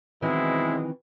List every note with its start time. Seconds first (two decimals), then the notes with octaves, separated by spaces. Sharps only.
0.22 B2 D#3 E3 F#3 G#3 C4 E4